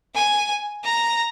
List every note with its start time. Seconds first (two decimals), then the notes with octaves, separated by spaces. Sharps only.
0.15 G#5
0.84 A#5